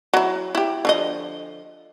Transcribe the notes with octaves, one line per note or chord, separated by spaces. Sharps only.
F#3 E4
E4 G4
D3 F3 D#5